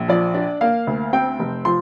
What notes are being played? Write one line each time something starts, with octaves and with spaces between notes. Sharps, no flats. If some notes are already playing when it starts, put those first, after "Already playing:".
Already playing: A#1
F3 D5
D4
A#3 F5
D2
C4 G5
F1
F3 C6